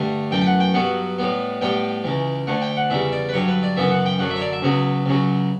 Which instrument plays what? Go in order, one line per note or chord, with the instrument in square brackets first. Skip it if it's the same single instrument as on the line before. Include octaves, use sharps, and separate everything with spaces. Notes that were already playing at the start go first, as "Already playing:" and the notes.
Already playing: [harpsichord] G2 D3 A3
F#2 E3 A3 G5
G5
F#5
G5
G2 F#3 B3 F#5
A2 G3 B3
A2 G3 B3 G5
C#2 C#3 E3
D2 D3 A3 F#5
G5
F#5
E2 C#3 E3 G3 E5
D5
B4
G2 D3 F#3 C#5
B4
D5
F#2 C#3 E3 B3 E5
F#5
G5
F#2 D3 F#3 F#5
E5
C#5
D5
E5
C#2 C#3 F#3 B3
C#2 C#3 F#3